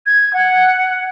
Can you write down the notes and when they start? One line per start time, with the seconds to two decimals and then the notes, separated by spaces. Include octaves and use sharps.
0.06 G#6
0.33 F#5